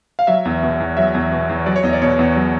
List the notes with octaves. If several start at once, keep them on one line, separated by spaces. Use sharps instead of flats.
F5
F#3 E5
E2
B2
E2
F#3 E5
E2
B2
E2
F#3 D5
C#5
E2 D#5
D5
B2 C#5
E2
F#3